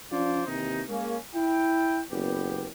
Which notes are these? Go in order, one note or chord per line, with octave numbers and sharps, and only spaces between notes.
F3 C#4 D4 F4 C5 D5
D#2 C3 D#3 E3 D#4
G#3 A#3 C#4
E4 G5
F#1 B3 G4